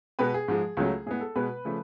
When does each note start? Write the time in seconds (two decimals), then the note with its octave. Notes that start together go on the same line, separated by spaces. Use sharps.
0.19 B2 G#3 B3 B4
0.34 G#4
0.48 G#2 F3 G#3
0.77 C#2 C#3 F#3 A3
1.06 A2 G#3 B3 G#4
1.21 A4
1.36 B2 G#3 B3 B4
1.65 C#3 F3 A3